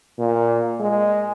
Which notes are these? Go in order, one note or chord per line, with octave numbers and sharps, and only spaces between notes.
A#2
G#3